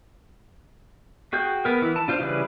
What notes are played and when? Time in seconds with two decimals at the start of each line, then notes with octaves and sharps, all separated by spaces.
1.33 F#4 G#4 G5 G6
1.65 B3 A#4
1.82 E3 E4
1.96 A5
2.08 D4 F4 C5 F5
2.20 C#3 E3 G3 G#4 B4